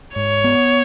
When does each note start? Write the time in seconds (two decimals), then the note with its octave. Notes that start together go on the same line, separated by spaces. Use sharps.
0.15 G#2 C#5
0.44 B3